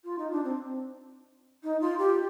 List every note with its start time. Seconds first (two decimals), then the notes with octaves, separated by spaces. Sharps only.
0.04 F4
0.18 D#4
0.31 D4
0.44 C4
1.63 D#4
1.81 F4
1.98 G4